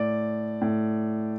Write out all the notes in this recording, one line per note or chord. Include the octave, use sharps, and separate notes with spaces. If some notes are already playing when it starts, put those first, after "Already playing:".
Already playing: A2 D5
A2